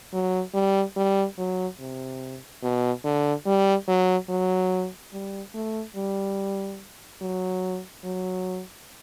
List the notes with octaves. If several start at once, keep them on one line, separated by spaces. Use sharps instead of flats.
F#3
G3
G3
F#3
C3
B2
D3
G3
F#3
F#3
G3
A3
G3
F#3
F#3